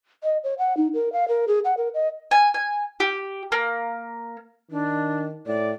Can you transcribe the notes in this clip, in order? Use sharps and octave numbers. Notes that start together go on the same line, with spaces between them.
D#5
C#5
F#5
D#4
A#4
F5
A#4
G#4
F#5
A#4
D#5
G#5
G#5
G4
A#3
D#3 D4
A2 D5